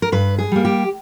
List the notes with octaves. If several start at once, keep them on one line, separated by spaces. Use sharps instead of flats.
A#4
G2 B4
G#4
G3 A#3
G4